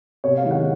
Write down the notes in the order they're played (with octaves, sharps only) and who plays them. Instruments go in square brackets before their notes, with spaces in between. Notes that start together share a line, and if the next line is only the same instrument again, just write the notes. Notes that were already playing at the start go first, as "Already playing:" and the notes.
[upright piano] C3 C#5
F5
D#3 G#3
F#5